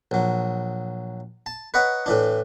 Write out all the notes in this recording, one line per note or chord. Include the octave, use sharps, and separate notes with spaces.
A#1 F#3
A5
B4 C#5 D#5 F#5 A#5
A2 E3 D4